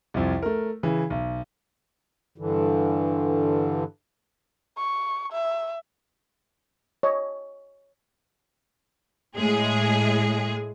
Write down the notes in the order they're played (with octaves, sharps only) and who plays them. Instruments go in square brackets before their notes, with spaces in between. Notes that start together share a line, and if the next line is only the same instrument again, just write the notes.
[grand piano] C2 F2
A3 A#4
C#3 E3
B1
[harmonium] G2 D3 E3
[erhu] C#6
E5
[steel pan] C#5 D#5
[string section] A2 G#3 G#4